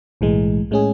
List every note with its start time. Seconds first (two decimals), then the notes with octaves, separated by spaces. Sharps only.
0.21 B1 A2 E3 G#3
0.71 A2 G#3 C#4 G#4